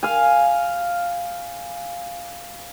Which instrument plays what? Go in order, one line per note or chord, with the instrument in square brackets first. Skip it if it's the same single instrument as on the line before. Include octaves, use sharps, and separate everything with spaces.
[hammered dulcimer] F5 G#5